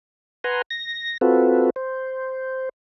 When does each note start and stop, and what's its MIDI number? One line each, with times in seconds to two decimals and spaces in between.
0.44 0.62 71
0.44 0.62 78
0.44 0.62 80
0.44 0.62 82
0.44 0.62 84
0.71 1.18 94
1.21 1.70 60
1.21 1.70 65
1.21 1.70 66
1.21 1.70 69
1.21 1.70 71
1.76 2.69 72